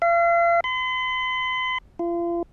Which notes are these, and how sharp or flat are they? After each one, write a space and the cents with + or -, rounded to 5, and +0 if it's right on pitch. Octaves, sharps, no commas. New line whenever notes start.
F5 -40
C6 -45
F4 -35